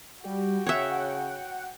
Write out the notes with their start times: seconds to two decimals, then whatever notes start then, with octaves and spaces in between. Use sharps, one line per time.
0.24 G3 F#4 G4 G5
0.67 C#3 C#5 E5 F#5